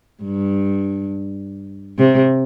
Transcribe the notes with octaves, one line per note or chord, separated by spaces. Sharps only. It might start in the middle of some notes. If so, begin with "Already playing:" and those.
G2
C3